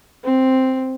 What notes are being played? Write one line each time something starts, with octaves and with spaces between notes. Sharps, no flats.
C4